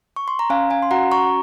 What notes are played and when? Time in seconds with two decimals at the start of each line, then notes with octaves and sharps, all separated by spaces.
0.16 C#6
0.28 C6
0.39 A#5
0.50 C#4 F5 G#5
0.70 F5 G#5
0.82 C6
0.91 F#4 F#5 A#5
1.11 A#5 C#6